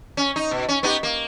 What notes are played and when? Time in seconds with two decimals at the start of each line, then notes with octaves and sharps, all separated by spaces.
0.17 C#4
0.36 D#4
0.51 B2
0.69 C#4
0.83 B3 D#4 G4
1.03 A#3